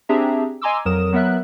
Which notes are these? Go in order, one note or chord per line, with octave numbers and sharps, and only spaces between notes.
C4 D4 G4 G#4 E5 A#5
D#5 G#5 A#5 C6 D6 E6
F2 F#3 A#4 D#6 E7
F#3 B3 A#4 E5 F#6